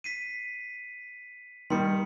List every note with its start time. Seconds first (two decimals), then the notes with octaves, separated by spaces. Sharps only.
0.04 B6 C7 D#7
1.70 D#3 G3 C6 C#7